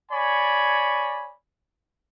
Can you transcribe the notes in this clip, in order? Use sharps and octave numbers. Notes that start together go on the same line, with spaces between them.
C#5 D5 G#5 B5